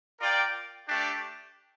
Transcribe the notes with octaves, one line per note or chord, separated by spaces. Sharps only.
F4 A#4 D5 G5
A3 D4 G4